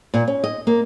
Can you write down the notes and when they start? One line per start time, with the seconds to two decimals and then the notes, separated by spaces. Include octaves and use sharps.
0.14 A#2
0.28 C#4
0.44 D#5
0.67 A#3